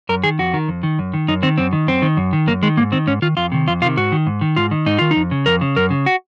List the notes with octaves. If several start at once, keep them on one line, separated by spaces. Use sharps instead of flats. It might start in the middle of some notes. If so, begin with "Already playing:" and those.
F#2 A#4
D#3 G#4
F2 F#4
D#3
F2
D#3
F#2
D#3
F#2 D#4
D#3 C4
F#2 C4
D#3
F#2 C4
D#3
F#2
D#3
F#2 A#3
D#3 G#3
G#2 A#3
D#3 C4
G#2 C#4
D#3 F4
F2 F4
C3 D#3
F2 F4
C3 D#3 F4
G#2 F#4
D#3
G#2
D#3
G#2 F4
D#3
G#2 D#4
D#3 F4
D#4
F2
C#3
F2 A#4
C#3
F#2 A#4
C#3
F#4